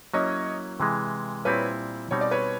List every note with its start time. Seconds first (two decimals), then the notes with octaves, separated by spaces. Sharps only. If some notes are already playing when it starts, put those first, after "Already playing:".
0.14 F#3 A#3 C#4 E4 C#5 D#5
0.80 C3 E3 G#3
1.45 A#2 G3 C4 E4 B4 C#5
2.11 B2 G3 C4 D#4 C#5
2.21 D5
2.31 B4 C#5